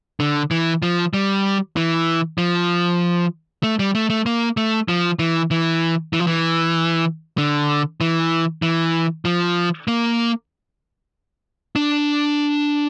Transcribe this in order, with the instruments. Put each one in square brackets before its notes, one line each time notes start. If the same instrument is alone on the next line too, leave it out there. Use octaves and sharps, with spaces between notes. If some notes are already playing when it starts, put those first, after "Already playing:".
[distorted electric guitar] D3
E3
F3
G3
E3
F3
A3
G3
A3
A3
A#3
A3
F3
E3
E3
E3
F3
E3
D3
E3
E3
F3
A#3
D4